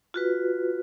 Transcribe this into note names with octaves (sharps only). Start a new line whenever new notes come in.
F4 F#4 B4